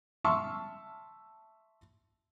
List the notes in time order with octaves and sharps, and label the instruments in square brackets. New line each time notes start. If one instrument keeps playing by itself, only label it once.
[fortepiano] E5 A5 C6 C#6 F6